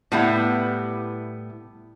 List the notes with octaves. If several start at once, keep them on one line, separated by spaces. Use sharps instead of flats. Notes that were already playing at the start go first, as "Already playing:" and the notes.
A2 G3 B3 E4 B4